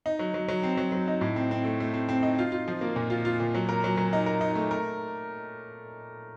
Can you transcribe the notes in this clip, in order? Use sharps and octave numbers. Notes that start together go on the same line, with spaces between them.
D#4
F#3
F#3
F#3
C4
F#3
F#3
D#4
A2
C4
C4
A3
A3
C4
C4
D#4
F4
F4
F3
A#3
A#2
F4
F4
A#2
F#3
A#4
F#3
F#3
D#4
A#4
D#4
A3
A#4